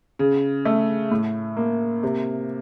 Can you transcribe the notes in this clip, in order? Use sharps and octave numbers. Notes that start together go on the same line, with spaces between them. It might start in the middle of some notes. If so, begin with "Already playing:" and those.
C#3
A3
A2
A#3
C3